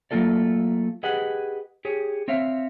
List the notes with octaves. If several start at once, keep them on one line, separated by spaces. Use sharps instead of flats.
F#3 A3 A#3 F4 A4 D5
G4 G#4 B4 D#5 F#5
G4 G#4 C#5
C4 C#5 E5 F5